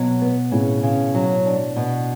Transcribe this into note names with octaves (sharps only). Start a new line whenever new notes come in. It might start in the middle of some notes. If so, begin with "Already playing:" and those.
Already playing: B2 F#3
B3
A2 C#3
C#3
F#3
D4
B2